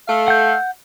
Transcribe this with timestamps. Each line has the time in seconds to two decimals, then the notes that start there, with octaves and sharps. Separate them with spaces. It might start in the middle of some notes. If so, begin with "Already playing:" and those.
0.08 A3 A4 F5
0.28 F#5 G6